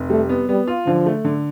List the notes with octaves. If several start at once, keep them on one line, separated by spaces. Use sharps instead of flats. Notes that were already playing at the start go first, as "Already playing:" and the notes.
Already playing: F1
G3 A3
B3
G3 B3
F4
D3 F3
A3
D3